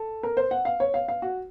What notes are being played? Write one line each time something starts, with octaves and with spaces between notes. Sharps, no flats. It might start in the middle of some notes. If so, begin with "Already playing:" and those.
Already playing: A4
A#4
C5
F#5
F5
C#5
F5
F5
F#4